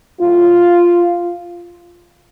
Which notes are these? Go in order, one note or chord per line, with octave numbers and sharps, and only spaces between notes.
A2 F#3 A3 F4